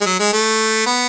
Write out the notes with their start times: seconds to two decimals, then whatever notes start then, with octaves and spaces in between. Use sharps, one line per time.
0.01 G#3
0.06 F#3
0.19 G#3
0.33 A3
0.86 B3